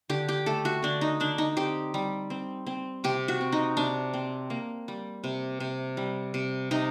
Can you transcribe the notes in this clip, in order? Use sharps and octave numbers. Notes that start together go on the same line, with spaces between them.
D3 G4
G4
A3 A4
F#4
D3 D4
D#4
D3 D4
D#4
C4 G4
G3
C4
C4
C3 G4
F#4
C4
D#4
C3 D4
C4
A#3
G3
C3
C3
G3
C3
C3 D#4